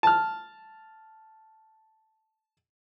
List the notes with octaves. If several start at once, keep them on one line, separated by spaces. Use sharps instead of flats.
A5 F6